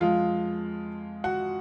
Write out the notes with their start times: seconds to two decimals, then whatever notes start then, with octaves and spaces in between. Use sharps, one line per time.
0.01 F2 F3 G#3 F4 F5
1.24 F#4 F#5